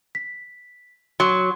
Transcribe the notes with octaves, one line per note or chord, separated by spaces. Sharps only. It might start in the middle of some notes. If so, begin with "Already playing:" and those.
B6
F#3 C6